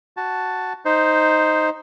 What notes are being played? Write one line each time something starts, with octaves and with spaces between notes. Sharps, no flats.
F#4 A5
D#4 C5